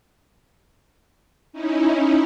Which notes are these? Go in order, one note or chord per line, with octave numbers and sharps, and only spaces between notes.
C#4 D#4 E4